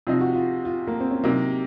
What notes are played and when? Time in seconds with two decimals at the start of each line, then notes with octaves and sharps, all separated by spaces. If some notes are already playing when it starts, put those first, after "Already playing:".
0.07 C3 F3 C4 D#4 F4
0.21 F#4
0.34 F4
0.65 F4
0.87 A#3
1.00 C4
1.11 C#4
1.23 C3 F#3 A#3 D#4